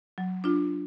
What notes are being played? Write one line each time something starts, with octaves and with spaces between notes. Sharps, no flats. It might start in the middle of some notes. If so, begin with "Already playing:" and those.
F#3
D4 F4